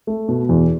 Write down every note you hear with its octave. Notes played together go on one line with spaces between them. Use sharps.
A3
B2
E2